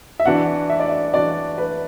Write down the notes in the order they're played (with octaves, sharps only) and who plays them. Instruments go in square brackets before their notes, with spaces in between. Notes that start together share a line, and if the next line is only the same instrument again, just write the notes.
[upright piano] E5
[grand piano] E3 D4 F#4 [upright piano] F#5
[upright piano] E5
D5
E5
[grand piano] E3 D4 F#4 [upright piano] D5
[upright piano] B4